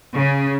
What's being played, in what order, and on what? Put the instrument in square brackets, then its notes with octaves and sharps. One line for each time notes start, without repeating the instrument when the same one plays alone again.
[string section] C#3